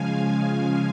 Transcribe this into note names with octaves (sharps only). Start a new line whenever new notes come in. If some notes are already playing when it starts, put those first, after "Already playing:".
Already playing: C#3 F3 G#3 F5 G#5
G#5